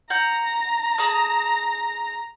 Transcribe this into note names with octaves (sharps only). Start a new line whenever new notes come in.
F#5 A#5 G6
G#4 A5 D#6